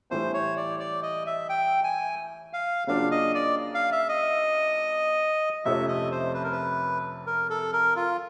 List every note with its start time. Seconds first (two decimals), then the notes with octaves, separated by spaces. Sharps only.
0.11 A2 E3 G3 C5
0.34 C#5
0.57 D5
0.80 D5
1.03 D#5
1.26 E5
1.49 G5
1.84 G#5
2.53 F5
2.87 C#3 F#3 A#3 D4 F4 F5
3.11 D#5
3.35 D5
3.74 F5
3.92 E5
4.09 D#5
5.65 F2 C3 F3 A3 C#4 E5
5.88 D#5
6.12 C5
6.34 B4
6.44 A#4
6.52 B4
7.27 A#4
7.50 A4
7.73 A#4
7.96 F4